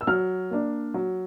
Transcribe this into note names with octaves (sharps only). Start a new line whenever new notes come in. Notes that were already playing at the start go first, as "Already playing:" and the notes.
E6
F#3 F6
A#3 D4
F#3